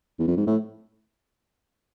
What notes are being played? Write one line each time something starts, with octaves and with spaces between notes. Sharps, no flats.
E2
F2
G#2
A2